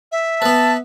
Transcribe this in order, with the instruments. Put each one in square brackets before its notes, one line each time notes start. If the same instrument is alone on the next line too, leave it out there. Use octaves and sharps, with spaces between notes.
[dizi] E5
[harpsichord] B3 B4 [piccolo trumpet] A5